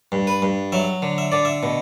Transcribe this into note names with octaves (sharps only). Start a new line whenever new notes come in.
G2
B4
G2
F#3 E5
D3
E5
D3 D5
E5
B2